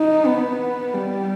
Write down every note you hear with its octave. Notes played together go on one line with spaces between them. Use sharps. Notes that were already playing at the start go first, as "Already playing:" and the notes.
Already playing: D#4
B3
G3